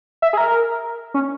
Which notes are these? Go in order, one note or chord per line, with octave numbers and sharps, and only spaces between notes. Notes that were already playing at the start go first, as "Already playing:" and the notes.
E5
G#4
A#4
C#4